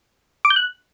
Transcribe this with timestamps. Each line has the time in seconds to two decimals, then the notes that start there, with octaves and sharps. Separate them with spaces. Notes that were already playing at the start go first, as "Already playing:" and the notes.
0.45 D6
0.50 G6
0.56 F#6